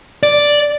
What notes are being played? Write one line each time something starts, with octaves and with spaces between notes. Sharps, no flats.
D5